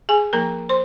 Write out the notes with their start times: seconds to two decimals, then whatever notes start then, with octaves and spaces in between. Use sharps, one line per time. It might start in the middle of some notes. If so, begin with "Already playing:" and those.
0.09 G#4 G#5
0.33 F3 A#3 D#4 A#4 A#5
0.69 C5 C6